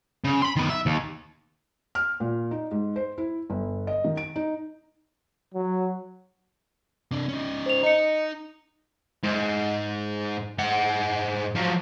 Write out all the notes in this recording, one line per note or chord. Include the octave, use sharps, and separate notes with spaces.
C#3
B5 C6
D#3 B3
E5
D#2
F6
A#2
D#4
G#2
C5
E4
G1
D#5
D#3
D7
D#4
F#3
C3 D4
C#4 D#4
C5 F7
D#4 D#5 A#5 C#7
G#2
G#2 F#5
F3 F#3